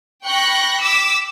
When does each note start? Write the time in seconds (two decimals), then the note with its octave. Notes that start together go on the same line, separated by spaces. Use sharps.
0.25 G5 B5 C#6 F#6 A#6
0.81 D6 E6 B6